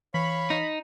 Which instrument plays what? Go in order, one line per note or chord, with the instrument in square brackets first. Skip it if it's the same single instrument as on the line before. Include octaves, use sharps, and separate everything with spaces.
[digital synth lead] E3 [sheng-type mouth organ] C#5 F5 C#6 [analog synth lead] B5
[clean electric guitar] D#4